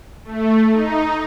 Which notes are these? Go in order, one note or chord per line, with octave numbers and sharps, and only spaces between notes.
A3
D#4